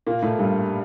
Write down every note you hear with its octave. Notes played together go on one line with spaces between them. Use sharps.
A#2 A#3
A2 A3
G2 G3